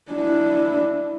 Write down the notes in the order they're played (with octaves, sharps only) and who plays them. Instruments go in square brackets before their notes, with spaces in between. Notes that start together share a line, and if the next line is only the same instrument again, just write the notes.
[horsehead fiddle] D4 E4